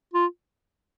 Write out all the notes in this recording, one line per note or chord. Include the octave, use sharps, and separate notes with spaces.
F4